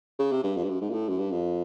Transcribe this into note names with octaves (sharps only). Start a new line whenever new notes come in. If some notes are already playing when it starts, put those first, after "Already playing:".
C#3
C3
G2
F2
G2
F#2
G#2
A#2
A2
F#2
G2
F2